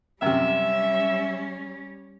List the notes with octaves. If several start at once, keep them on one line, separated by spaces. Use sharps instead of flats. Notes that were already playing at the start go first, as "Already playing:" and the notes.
F#2 C3 G3 C#4 E5